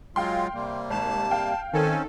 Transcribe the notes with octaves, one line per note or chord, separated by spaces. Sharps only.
F#3 G#3 F4 F5 G5 C6
C3 G3 A#3
G#1 A5 E7
F5 G5
D#3 C4 C#4 A4 G#5